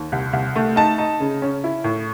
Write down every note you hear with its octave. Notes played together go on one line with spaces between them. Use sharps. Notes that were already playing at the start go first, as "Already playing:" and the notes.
Already playing: D#2
C2
C2
A3
D#4 A5
D#4
C#3
C#4
E4
A2